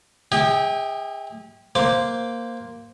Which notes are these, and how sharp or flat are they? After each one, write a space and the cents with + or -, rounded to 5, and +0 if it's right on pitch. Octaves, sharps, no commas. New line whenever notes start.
G#4 -35 E5 -35 G5 +0
A#3 +0 C5 -5 D6 +0